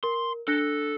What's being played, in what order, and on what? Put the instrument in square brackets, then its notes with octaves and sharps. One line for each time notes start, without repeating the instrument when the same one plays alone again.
[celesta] A#4 [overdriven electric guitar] C6
[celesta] D4 F#6 A#6 [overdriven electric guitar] A4